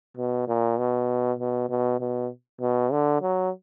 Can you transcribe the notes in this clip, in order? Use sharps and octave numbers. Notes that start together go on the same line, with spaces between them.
B2
A#2
B2
B2
B2
B2
B2
D3
F#3